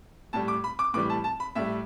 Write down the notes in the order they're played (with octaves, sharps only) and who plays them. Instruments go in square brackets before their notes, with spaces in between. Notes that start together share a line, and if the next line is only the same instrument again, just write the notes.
[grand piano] A2 G3 A5
D6
B5
D6
A2 E3 G3 D6
A5
A5
B5
A2 G3 E5